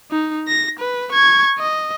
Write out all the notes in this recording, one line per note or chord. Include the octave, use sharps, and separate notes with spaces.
D#4
A#6
B4
C#6 G#6
D#5